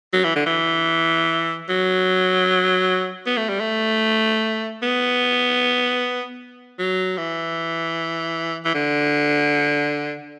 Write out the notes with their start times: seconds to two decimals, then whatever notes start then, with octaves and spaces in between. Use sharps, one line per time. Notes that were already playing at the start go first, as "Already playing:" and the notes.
0.13 F#3
0.24 E3
0.35 D3
0.46 E3
1.69 F#3
3.26 B3
3.37 A3
3.49 G3
3.60 A3
4.82 B3
6.79 F#3
7.17 E3
8.65 E3
8.74 D3